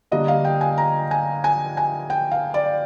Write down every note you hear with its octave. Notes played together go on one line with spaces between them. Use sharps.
D3 G3 A#3 D4 D#5
F5
G5
G#5
A#5
G#5
G#5
G#5
G5
F5
D5